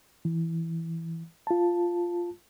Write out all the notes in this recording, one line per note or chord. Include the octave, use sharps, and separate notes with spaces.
E3
F4 A5